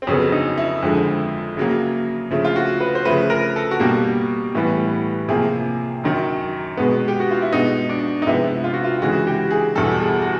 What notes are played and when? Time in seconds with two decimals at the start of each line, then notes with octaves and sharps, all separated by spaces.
0.02 C4
0.07 F2 C#3 F#3 B3 C#4
0.32 D#4
0.58 E4
0.83 F2 D3 F3 G#3
1.57 C#3 F#3 A#3
2.31 C#3 F3 A3
2.45 F4
2.56 F#4
2.80 B4
2.95 C5
3.05 C#3 F3 A3 B4
3.30 A#4
3.56 A4
3.71 F#4
3.80 B2 G3 A#3 G4
4.54 A2 E3 G3 B3
5.28 C3 F3 A#3 G#4
6.04 F#2 D#3 F#3
6.77 B2 G#3 B3
7.08 G4
7.20 F#4
7.31 F4
7.42 E4
7.52 B2 G#3 B3 D#4
7.89 D4
8.22 D#4
8.27 C3 F3 G#3 B3 E4
8.64 F4
8.74 F#4
8.84 F4
9.02 C#3 E3 G#3 F#4
9.27 G4
9.51 G#4
9.75 E2 B2 G3 A4
10.00 G#4
10.22 F#4